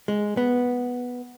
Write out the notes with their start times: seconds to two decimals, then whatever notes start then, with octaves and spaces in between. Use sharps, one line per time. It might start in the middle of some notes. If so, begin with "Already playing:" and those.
0.08 G#3
0.37 B3